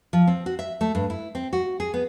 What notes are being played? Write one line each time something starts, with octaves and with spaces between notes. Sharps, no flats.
F3
C4
F#4
E5
A3
G2
E4
C4
F#4
G#4
B3